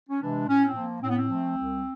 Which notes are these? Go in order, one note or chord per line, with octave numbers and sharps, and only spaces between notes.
C#4
C3 E3 G#3 D4
A2 C#4
C4
F3 A#3
A2 C4
B3
C4
F3 A3
C2